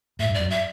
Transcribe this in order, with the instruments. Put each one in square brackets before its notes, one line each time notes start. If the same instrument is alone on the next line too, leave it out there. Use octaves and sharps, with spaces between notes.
[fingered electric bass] A2 [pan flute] E5
[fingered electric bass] G2
[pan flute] D5
[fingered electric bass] F#2
[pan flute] E5